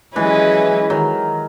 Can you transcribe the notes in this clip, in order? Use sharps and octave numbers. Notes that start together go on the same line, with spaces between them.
E3 F#3 G#3 C#4 E4 B4 D#5
D#3 F#3